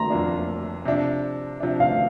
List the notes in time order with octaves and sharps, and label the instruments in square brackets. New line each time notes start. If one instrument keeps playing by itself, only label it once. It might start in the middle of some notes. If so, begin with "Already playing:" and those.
Already playing: [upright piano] A#5 C6
[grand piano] F2 F3 A#3 D4
C3 F3 D4
C3 F3 D4
[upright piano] F5